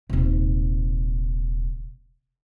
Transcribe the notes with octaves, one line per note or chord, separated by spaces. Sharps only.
D#1 C3